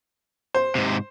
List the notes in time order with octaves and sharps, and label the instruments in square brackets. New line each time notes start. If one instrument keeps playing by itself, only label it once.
[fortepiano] C5
[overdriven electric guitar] G#2 C3